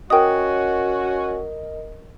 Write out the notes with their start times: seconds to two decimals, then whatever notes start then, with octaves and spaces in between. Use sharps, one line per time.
0.10 C#4 F#4 A#4 D#5 G5 D#6